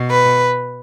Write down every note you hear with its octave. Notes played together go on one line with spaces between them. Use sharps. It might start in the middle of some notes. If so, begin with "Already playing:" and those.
Already playing: B2
B4